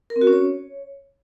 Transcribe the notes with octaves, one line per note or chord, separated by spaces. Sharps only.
A#4
C4
F#4
C#4
C#5